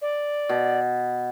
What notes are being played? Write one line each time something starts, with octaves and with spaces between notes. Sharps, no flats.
D5
B2